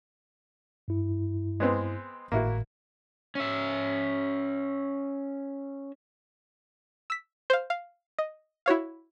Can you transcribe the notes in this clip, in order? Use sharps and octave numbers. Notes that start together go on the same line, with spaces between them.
G2 E4
G#3 B3 C4
G#1 A2 A#3 E4 F#4
C#4 E5
E6 B6
C5 F5
F5
D#5
E4 F#4 C#5 F5